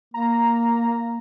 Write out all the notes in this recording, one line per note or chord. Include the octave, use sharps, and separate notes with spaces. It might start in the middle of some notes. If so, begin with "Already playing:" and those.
A#3 A#5